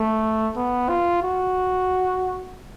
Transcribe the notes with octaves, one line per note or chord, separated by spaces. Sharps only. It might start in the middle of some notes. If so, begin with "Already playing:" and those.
Already playing: A3
B3
F4
F#4